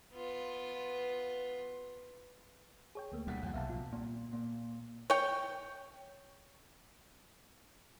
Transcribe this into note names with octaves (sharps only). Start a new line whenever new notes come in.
B3 F4
G#4 C#5 G5
D2 A3 A#3
D2 B2 G3 F#5 B6
D#2 F3 F#5
B1 C3 E5 F5 A5
A#2 F4
A#2
A#2
C#5 G5